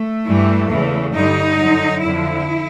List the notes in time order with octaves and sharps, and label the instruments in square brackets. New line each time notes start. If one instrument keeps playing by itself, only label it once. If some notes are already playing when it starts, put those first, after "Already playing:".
Already playing: [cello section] A3
G2 E3 G3
E2 C#3 E3
G2 D3 G3 D#4
F#2 D3 F#3
F2 D3 F3 E4